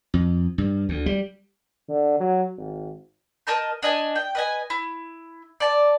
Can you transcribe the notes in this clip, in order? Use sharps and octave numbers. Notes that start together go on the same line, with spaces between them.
F2
G2
D2
G3
D3
F#3
G#1
A#4 D#5 A5 G6
D4 D#5 G#5
G5
B4 D#5 G#5
E4
D5 A5